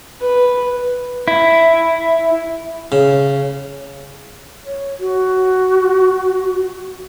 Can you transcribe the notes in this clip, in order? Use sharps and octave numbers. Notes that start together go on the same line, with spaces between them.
B4
E4
C#3
C#5
F#4